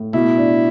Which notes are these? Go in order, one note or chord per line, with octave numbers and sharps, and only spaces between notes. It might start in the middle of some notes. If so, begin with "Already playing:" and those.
Already playing: A2
B2 E4
D4